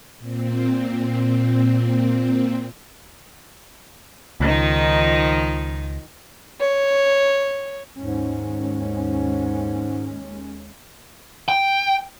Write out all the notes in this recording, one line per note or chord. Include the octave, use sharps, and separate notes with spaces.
A#2 C4
C#2 D#3 F3 D#4
C#5
D#2 G#2 G#3 C#4
G5